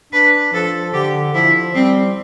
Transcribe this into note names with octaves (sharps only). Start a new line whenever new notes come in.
D4 B4
F3 A4
D3 G4
F3 E4
G3 C4